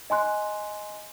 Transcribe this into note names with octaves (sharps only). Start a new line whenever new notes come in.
D#5 G#5 C6 F#6